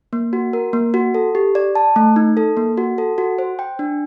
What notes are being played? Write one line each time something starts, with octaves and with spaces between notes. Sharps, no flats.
A#3
F#4
A#4
A#3
F#4
A4
G4
D5
A5
A3
D#4
A4
A#3
F#4
A4
F#4
C5
G5
D4